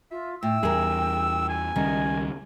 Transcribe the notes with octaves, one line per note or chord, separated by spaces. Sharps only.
F4 E5
A2 G5 E6
E2 G3 G#4 A#4
G#5
C#2 D#3 G3 C#4 D#5